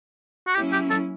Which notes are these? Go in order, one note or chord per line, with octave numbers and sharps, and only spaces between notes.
F#4
F#3 A#3 C#4 E4 G4
G4
A4